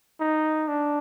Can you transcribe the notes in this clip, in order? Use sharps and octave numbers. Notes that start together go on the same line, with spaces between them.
D#4
D4